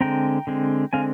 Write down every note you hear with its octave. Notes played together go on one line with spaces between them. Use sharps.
D3 G#3 C4 G5 A#5
D3 G#3 C4
D3 G#3 C4 F5 G#5